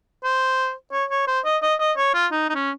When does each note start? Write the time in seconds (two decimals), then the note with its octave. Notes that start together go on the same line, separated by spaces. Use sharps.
0.24 C5
0.92 C#5
1.10 C#5
1.27 C5
1.45 D#5
1.62 D#5
1.80 D#5
1.97 C#5
2.14 F4
2.32 D#4
2.49 D#4
2.55 C#4